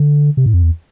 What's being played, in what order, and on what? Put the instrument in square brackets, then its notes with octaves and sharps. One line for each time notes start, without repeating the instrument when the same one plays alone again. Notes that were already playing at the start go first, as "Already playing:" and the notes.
Already playing: [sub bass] D3
C3
A2
F2
E2